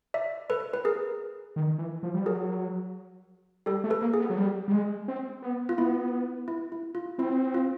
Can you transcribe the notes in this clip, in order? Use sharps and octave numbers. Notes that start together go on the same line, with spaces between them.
D5 E5
A4 B4
B4
G#4 A#4
D#3
E3
F3
G3
F#3 G#4 A#4
G3 G4 A4
A3
A4 B4
A#3
G#4
B3
F#3
G3
G3
G#3
C4
B3
F4
B3 E4
E4
E4
F4
C4 E4
F4